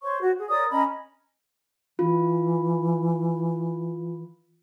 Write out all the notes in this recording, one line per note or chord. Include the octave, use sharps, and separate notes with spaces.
C5 C#5 C#6
F#4
G#4
A#4 C#5 D5 D#6
C#4 D#5 A#5 B5
E3 F4